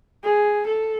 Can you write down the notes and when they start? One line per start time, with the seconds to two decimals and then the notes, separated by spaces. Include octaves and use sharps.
0.24 G#4
0.67 A4